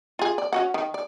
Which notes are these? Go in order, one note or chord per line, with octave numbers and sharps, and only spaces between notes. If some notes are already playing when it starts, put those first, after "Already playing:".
F4 G#4
D5
C#4 F#4 F#5
D#3
D5